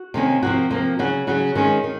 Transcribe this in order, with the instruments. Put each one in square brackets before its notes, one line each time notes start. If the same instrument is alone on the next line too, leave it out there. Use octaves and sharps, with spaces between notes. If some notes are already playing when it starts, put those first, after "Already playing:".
Already playing: [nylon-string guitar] F#4
C3 D#3 A#3 C#4
C3 F3 A#3 F#4
C3 F3 A#3
C#3 F#3 C#4 F#4
C#3 F#3 C#4 F#4
D#3 G#3 C#4
D#3